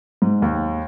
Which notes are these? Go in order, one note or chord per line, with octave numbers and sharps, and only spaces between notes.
G#2
D#2